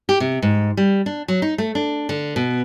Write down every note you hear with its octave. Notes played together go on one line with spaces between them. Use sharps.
G4
C3
G#2
G3
D4
F#3
D#4
A3
D4
D3
B2